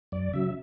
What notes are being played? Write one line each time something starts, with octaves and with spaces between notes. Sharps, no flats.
F#2 D5
C#3 F#3 E5